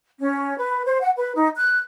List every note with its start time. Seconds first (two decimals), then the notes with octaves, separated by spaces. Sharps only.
0.20 C#4
0.57 B4
0.85 C5
1.01 F#5
1.17 B4
1.35 D#4
1.56 F#6